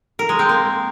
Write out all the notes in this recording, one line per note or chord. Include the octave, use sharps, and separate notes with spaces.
A#4
G#3
C4
A#3